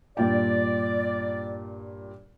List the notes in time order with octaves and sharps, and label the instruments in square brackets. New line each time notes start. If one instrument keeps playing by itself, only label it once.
[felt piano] G2 A#2 G5 [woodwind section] D5